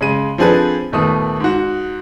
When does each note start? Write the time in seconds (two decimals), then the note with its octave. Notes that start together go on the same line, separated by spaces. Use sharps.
0.01 C#3 G#3 D#7
0.38 F3 C4 D4 G#4 A4 B4
0.92 D#1 D#2 A3 B3 D#6
1.40 G#2 F#4